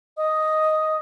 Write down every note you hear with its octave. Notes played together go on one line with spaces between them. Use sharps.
D#5 D#6